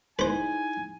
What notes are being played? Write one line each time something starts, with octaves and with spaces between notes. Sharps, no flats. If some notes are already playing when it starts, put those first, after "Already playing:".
D#4 E4 G#4 B4 C5 G#5